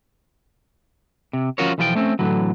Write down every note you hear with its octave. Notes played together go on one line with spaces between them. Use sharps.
C3
F3 C#4 F4 F#4 A#4 C#5
B1 E3 F3 F4 C5 G5
A3 C4 C#4
A2 D3 E3 F#3